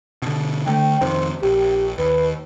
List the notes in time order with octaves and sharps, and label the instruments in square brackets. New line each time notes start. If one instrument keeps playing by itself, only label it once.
[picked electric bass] B2 D3
[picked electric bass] D3 A3 [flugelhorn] G5
[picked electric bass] F2 C3 D#3 [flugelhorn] C5
[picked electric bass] A#1 [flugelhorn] G4
[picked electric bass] D#2 [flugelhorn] B4